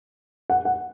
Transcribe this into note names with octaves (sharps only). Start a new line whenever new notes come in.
F#5
F#5